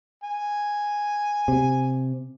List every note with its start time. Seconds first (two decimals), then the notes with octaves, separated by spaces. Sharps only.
0.24 G#5
1.48 C3